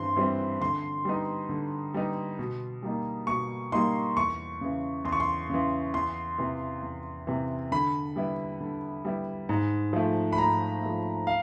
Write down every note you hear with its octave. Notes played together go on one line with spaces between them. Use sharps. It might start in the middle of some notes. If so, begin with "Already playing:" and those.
Already playing: G2 E3 C4 C6
E3 G3 C4
D3 C6
G3 B3 D#4
D3
G3 B3 D#4
B2
G3 A#3 D#4
B2 C#6
G3 A#3 D#4 C6
E2 C#6
C#3 E3
E2 C6
C#6
C6
C#3 E3
E2 C6
C3 E3
E2
C3 E3
D3 B5
G3 B3 E4
D3
G3 B3 E4
G#2
F3 A3
B5
G#2 A#5
F3 A3
F5